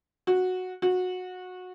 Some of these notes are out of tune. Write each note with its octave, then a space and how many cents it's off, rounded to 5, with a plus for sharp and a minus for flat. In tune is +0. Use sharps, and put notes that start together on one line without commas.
F#4 -10
F#4 -20